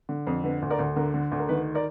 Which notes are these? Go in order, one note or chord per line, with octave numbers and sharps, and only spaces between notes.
D3
F2
D3 B4
D2
A#4 D5
D2
D3 A#4
D3
D2
A#4
D#3 B4
A#4 D5